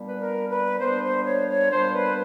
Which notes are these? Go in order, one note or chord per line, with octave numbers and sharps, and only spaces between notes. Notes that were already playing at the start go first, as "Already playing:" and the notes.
Already playing: A#2 G3 B3 D4
B4
A#4
B4
A#2 G3 B3 D4 C5
C5
C#5
C#5
A#2 G3 B3 D4 C5
B4